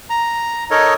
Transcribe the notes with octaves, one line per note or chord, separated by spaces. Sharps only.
A#5
D#4 A4 A#4 C#5 D#5